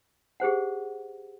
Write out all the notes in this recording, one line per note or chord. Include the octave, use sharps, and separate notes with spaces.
G4 G#4 C5 F#5